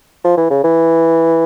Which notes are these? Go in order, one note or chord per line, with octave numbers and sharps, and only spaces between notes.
F3
E3
C#3
E3